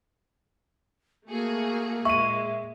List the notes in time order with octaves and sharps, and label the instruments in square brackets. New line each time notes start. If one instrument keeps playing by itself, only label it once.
[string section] A3 F#4 G#4 [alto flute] A#3
[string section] A#2 G#3 [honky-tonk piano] E5 D#7 [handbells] C#6